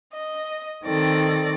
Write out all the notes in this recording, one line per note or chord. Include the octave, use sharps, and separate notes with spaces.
D#5
D#3 C4 A4 D5 A#6